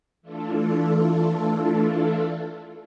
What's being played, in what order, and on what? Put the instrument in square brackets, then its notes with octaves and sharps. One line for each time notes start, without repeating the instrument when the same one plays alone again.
[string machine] E3 A3 D4 F4 A4